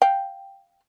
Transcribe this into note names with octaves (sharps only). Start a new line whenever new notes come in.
F5 G5